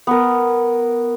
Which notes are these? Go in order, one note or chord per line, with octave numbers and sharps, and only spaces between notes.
B3 A#4